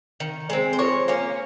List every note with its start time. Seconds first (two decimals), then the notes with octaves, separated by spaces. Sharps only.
0.20 D#3
0.50 G#3 C4
0.73 C5
0.79 F3 A#4 C#5
1.08 A#3 C#4